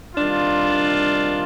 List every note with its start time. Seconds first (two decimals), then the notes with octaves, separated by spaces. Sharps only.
0.15 C3 D#3 G3 D4 F4